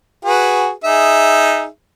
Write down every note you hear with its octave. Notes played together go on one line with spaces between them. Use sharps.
F#4 G#4 B4
D#4 G#4 E5